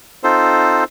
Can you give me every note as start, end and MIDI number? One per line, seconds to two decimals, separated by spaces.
0.24 0.84 60
0.24 0.84 63
0.24 0.84 65
0.24 0.84 69
0.24 0.84 72